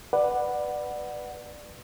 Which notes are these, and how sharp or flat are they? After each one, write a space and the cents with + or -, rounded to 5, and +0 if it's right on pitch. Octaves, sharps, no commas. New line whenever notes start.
B4 +0 D5 +15 F#5 +0